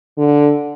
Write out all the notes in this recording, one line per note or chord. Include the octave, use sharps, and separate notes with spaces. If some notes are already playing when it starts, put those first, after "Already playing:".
D3